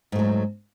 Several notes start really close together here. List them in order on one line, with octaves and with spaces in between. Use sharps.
G#2 A3 F#3